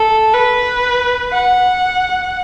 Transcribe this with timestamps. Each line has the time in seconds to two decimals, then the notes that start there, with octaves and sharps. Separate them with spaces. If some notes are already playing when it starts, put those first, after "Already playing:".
Already playing: A4
0.34 B4
1.33 F#5